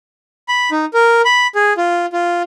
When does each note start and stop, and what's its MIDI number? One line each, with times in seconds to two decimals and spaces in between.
0.49 0.70 83
0.71 0.85 63
0.94 1.22 70
1.25 1.47 83
1.55 1.73 68
1.77 2.06 65
2.13 2.43 65